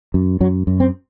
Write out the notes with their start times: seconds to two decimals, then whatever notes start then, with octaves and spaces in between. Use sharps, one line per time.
0.14 F#2
0.40 F#2 F#3
0.67 F#2
0.80 C4